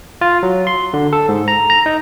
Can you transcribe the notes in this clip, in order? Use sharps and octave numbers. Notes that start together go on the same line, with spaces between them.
F4
F#3
C6
D3
A4
G#2
A#5
A#5
D#4